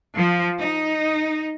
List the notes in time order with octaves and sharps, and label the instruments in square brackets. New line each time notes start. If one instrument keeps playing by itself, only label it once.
[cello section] F3
D#4